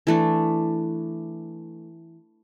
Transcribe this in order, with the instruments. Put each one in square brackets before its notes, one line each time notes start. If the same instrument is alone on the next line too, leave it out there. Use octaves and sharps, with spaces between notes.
[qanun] E3 A3 D4